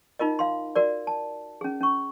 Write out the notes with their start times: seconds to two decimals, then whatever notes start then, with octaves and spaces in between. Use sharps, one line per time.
0.19 D#4 F4 A#4 D#5
0.39 F5 C6
0.76 F#4 A#4 D5
1.07 A5
1.61 C#4 G#4
1.81 C#4 C#6